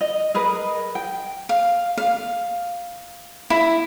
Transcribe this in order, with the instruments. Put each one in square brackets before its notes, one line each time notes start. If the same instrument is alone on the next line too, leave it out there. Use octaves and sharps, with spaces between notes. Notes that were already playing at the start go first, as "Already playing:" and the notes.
[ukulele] D#5
G#4 A#4 B4 D#5
G5
[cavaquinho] F5
F5
E4